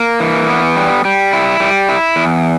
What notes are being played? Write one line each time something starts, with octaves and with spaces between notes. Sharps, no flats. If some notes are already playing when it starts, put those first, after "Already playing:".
Already playing: A#3
E3
B3
G3
G3
E4
G3
E4
E2